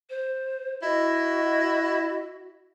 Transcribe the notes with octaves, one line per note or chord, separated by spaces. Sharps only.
C5
E4 F#4 D#5